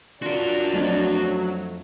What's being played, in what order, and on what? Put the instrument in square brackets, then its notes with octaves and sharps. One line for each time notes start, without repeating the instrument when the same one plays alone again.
[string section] D4 [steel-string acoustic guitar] F4 [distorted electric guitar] F#4 A#4
[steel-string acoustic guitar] F2 A3 C4 [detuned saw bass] F#3